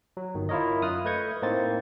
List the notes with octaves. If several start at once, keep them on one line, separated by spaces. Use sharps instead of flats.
F#3
G1 D#3
E4 F4 A#4 C#5 D#5
F#2 F4 D#6 F6 F#6
A3 B4 D#5 G6 G#6 C#7
A2 A#3 C4 D#4 C5 A6